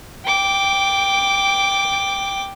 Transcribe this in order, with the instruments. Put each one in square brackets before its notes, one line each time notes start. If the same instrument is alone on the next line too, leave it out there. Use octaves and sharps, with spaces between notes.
[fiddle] G5 D6